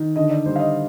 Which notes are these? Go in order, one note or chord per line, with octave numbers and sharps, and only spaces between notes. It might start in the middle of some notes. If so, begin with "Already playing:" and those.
Already playing: D#3
D3 D#5
D5
G3 C5
F5
D#5